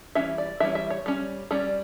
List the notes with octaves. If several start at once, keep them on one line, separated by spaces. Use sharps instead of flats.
E3 G3 C#4 E5
D5
E3 G3 C#4 E5
E5
C#5
G3 C#4
G3 C#4 D5